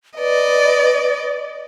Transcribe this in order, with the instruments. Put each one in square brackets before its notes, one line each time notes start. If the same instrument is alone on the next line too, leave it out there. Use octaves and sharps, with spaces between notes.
[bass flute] B4 [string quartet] D5 D#5